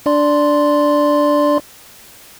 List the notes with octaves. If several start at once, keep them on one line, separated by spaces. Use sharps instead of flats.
D4 D5 C6